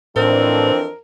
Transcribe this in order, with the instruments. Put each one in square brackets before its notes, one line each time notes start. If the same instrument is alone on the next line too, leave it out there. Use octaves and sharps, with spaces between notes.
[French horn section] F2 E3 D4 [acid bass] A2 [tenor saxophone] C4 [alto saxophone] A#4